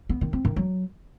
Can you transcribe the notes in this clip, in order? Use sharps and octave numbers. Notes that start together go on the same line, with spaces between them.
B3
D#3
C4
D#3
F#3